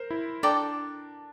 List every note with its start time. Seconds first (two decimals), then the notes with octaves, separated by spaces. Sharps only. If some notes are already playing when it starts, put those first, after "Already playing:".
Already playing: A#4 C5
0.10 E4
0.43 D4 A4 D5 G5 A#5